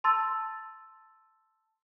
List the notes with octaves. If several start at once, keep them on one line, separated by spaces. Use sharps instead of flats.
A5 C6 E6 A6